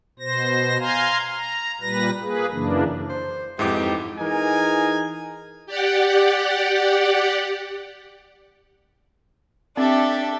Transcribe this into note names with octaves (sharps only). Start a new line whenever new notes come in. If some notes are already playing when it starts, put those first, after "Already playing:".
B2 C5 A#6
F5 G#5 A#5 C6
A#5
A#2 G3 B4 A#6
A#3 G#4 B4
F#2 C#3 E3 A#3 D4
C5
F2 G#2 E3 D#4 E4 G4 D6
E3 D#4 G#4 A#4 G#5
G4 D5 F#5
C4 D4 G4 A4 E5